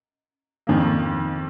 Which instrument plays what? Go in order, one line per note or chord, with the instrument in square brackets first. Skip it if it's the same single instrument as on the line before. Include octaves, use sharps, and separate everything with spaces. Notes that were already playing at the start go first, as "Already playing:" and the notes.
[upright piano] F2 D#3 A#3